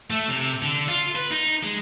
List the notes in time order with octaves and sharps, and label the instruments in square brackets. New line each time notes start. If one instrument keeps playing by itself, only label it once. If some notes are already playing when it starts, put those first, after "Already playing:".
[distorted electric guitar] A3
C3
D3
F4
B4
D#4
G#3